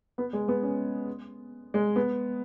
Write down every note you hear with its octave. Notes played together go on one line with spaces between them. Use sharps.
B3
G#3
B3
C#4
G#3
B3